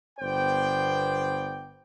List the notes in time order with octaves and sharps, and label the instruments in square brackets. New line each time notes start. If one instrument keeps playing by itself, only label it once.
[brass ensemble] G1 B3 C5 D5 G5